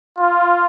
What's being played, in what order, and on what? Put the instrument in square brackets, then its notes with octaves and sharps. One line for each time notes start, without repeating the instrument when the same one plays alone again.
[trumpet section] F4